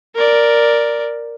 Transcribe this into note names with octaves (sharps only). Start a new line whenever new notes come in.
A#4 D5